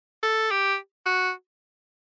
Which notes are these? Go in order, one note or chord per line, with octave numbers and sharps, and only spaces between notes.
A4
G4
F#4